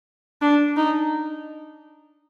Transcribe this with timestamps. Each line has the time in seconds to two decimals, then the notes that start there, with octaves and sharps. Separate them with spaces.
0.42 D4
0.77 D#4